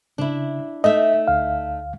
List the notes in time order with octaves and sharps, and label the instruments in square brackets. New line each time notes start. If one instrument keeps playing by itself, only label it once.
[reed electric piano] C#3 [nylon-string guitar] D4 E4
[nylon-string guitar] A3 D#4 E5 [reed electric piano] D#5
[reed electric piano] D2 F5